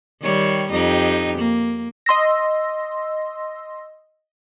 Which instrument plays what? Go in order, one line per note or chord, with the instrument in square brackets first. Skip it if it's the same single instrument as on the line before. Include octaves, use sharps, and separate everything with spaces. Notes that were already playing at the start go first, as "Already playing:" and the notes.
[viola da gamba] D#3 G3 C#5
F2 D#4 G4
A#3
[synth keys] D#5 C6 E6 A#6